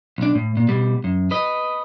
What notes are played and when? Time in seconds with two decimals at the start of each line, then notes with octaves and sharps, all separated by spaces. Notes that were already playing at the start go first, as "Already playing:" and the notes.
0.18 B1 D4
0.35 A2
0.57 A#2
0.69 B2 G3
1.04 F#2
1.31 B4 D#5